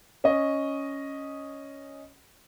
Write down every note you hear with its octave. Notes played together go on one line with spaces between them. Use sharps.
C#4 D#5